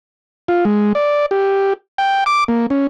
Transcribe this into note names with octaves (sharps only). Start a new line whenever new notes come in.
F4
G#3
D5
G4
G5
D6
A#3
C#4